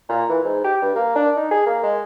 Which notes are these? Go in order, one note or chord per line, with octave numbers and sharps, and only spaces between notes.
A#2
E3
G#2
G4
G2
A#3
D4
D#4
G#4
A#3
G#3